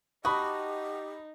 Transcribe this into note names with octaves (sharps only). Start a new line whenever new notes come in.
D#4 F#4 G4 A5 B5 D#6